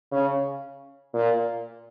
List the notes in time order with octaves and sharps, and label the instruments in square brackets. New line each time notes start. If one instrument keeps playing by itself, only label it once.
[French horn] C#3
A#2